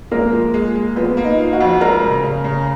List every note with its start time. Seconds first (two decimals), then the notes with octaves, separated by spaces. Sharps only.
0.11 G#3 A#3 A#4
0.32 F3
0.54 G#3
0.75 G#3
0.96 F3 B3 B4
1.17 A#3
1.24 D#4 D#5
1.38 F4
1.53 F#4 F#5
1.61 F2
1.81 G#3 A#4 A#5
2.03 C#3
2.23 C#3
2.44 C#3